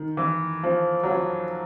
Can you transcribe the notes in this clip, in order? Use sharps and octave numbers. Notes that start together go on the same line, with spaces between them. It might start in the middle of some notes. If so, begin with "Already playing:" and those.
Already playing: D#3
E3
F3
F#3
F3